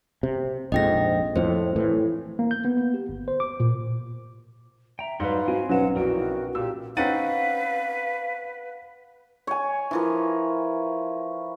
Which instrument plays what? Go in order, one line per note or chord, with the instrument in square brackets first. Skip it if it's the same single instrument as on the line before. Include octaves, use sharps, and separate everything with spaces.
[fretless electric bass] C3
[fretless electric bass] A#1 F2 G#2 [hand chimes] D#5 G5 A#6
[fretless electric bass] F2 A2 [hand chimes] C5
[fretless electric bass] A2 E3
[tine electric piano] A#3
G6
B3
B3
G4
G1
C5
D6
A#2
[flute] E5 [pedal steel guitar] G5 A#5
[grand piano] G#2 B4 [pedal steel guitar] F#3 G3 C6 [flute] F5 [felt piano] C#7
[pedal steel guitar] C4 G#5 [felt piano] F#4
[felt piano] B1 C#4 B4 [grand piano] F#3 E7 [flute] F#5
[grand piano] A#1 E3 [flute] F#4 [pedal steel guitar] A#4 G5
[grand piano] A#2 E6 [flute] G4
[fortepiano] C4 C#4 D#4 [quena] B4 [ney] F5 [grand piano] F#5 A6 D#7
[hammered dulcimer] C#5 G#5
E3 F3 A#4